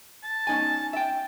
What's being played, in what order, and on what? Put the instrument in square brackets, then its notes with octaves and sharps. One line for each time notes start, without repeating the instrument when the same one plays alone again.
[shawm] A5
[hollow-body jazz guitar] C#4 D#4 G#5
E5 G5